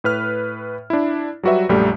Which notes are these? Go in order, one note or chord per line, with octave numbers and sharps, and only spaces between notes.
A2 B4 F6
D4 E4
F#3 G3 F#4 B4 E5
A#1 F#2 G3 A3